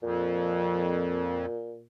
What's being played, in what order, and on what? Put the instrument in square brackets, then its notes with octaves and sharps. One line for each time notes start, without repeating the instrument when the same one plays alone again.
[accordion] F2 [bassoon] A#2